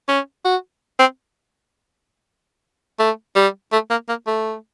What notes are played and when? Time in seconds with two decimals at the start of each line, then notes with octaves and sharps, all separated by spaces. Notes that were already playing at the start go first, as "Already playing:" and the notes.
0.08 C#4
0.45 F#4
0.99 C4
2.99 A3
3.36 G3
3.72 A3
3.90 A#3
4.09 A#3
4.27 A3